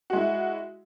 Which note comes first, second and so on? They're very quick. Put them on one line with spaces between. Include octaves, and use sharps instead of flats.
F#4 G#3 E4